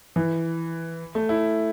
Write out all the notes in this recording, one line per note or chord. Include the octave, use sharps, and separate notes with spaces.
E3
A3
E4